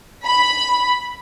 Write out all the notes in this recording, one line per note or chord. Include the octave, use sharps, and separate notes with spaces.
B5